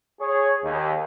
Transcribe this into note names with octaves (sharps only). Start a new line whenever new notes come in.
G#4 C#5
D#2